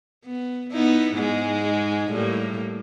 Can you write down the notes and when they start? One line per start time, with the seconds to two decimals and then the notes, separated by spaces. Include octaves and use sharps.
0.25 B3
0.72 B3 D#4 E4
1.15 G#2 G#3
2.12 A2 G3 A#3